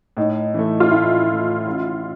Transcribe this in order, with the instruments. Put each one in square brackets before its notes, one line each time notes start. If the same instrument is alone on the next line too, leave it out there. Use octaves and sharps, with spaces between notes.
[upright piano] A2 [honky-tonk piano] D#4
[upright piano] E3 A3
[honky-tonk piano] F4
[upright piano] A2 [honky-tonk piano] E4
[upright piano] E3 A3
A1